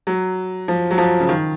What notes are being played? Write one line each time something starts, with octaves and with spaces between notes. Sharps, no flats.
F#3
F3
F#3
F3
C#3
D#3